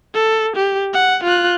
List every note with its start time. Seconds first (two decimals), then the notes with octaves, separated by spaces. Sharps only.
0.14 A4
0.56 G4
0.94 F#5
1.24 F4 F#6